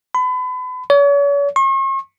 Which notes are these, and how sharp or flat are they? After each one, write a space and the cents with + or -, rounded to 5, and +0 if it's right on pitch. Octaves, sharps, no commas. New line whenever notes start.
B5 +35
C#5 +40
C#6 -45